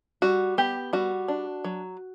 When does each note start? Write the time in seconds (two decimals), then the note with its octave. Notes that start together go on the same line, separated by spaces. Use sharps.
0.22 G3 F#4
0.58 B3 G4
0.93 G3 F#4
1.28 D4
1.65 F#3